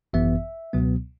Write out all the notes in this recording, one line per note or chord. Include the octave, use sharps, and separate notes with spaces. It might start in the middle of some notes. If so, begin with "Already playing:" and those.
G#1 F#2 E3 B3 E5
C#2 B2 F#3 B3